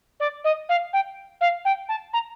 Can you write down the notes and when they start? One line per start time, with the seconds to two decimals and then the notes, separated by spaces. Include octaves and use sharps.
0.20 D5
0.44 D#5
0.69 F5
0.93 G5
1.41 F5
1.65 G5
1.88 A5
2.13 A#5